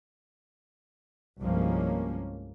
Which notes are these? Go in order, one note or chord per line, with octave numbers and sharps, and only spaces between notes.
C2 G2 F3 G#3 A#3 C#4